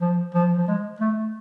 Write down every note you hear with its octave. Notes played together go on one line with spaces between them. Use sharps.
F3
F3
F3
G#3
A3